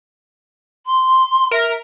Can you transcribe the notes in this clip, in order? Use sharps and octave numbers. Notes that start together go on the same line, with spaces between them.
C6
A#4 E5